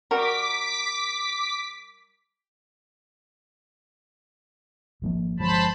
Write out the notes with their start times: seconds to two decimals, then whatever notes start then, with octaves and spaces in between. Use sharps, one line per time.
0.11 G3 F#4 A#4 D6 B6
5.02 G#1 F3 A#3
5.40 G1 F3 G#3 C5 A5 B5